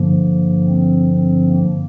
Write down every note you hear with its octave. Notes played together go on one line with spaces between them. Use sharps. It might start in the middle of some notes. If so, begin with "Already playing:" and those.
Already playing: G2 D3 F3 A#3
C4
C4
A#3